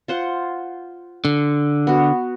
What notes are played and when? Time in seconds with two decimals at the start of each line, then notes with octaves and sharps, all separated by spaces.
0.08 F4 C5 F#5
1.25 D3
1.87 B3 F#4